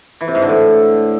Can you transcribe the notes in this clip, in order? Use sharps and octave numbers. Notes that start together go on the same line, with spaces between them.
E3
C3
G#2
D3
A2